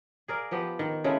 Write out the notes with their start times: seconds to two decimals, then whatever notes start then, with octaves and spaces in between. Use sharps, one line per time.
0.28 G#4 A#4 D5 F5
0.51 F3 B3 G4 D#5
0.79 D#3
1.04 C#3 G#3 A3 E4